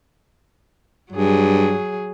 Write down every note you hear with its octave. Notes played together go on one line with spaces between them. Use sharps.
G2 F#3 G#4